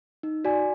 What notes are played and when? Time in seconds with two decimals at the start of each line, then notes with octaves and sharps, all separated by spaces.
0.23 D#4
0.45 F#4 D5 G#5